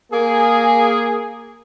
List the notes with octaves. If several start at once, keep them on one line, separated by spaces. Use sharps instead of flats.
A#3 G#4